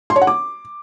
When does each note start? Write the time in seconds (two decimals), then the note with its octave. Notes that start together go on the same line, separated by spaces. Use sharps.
0.10 C6
0.16 C#5
0.22 F#5
0.27 D6